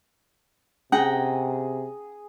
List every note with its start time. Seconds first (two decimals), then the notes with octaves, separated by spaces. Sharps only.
0.92 C3 C#4 G#4 F#5 G5 A#5